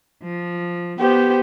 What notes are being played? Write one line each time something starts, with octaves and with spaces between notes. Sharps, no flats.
F3
B3 G4 C5